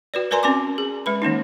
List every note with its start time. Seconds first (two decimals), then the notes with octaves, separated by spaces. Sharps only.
0.14 F#4 B4 D5
0.31 A#4 B4 D5 G#5 A#5 C6
0.43 C4 C#4 D5 G#5 C6 D6
0.78 G#4
1.06 G#3 B4 B5
1.22 D#3 A#3 C#4 D#4